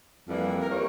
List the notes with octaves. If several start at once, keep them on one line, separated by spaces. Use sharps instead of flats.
F2 E3 G3 A#3
A#4
E3 G3 A#3 C#5